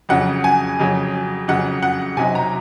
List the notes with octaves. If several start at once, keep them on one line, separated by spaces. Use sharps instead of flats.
F2 C#3 F#3 C#4 F#5
G#5
F2 C#3 F#3 C#4
F2 C#3 F#3 C#4 F#5
F#5
C3 F#3 C4 D#4 G#5
A#5